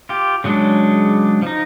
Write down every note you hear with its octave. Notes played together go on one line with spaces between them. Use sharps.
F4 G4
C#3 F#3 G#3 D4
F3 D#4